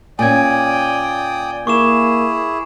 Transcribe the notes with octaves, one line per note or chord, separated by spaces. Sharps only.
A#2 C#4 D5 G5 G#5 D#6 G#6
A#3 E4 G#4 C#6 D6 E7